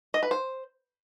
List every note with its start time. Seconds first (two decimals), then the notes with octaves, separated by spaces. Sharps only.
0.14 D#5
0.23 B4
0.31 C5